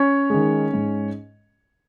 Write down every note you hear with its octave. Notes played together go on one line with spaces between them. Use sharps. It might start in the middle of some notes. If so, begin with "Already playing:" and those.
Already playing: C#4 C#5
D#3 G#3
G#2